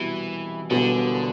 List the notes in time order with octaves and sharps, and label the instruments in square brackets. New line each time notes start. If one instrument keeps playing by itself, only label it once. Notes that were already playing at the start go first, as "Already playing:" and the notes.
Already playing: [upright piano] C2 B2 G3 [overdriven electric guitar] E3
[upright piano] E1 E2 B2 G3 B3 [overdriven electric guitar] D3